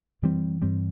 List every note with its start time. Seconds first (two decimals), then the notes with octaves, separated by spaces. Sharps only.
0.22 F#2 E3 G3 C4
0.62 G2 E3 G3 C4